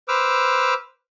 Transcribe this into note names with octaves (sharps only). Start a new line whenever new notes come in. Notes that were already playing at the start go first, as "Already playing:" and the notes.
B4 C5 D6 E6 F6